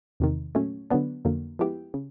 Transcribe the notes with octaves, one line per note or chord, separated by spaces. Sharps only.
E2 C3 D#3
A#2 F#3 A3 C#4
D3 F#3 B3 D4
F2 D3 F#3 A#3
F3 G#3 B3 E4 G4
C#3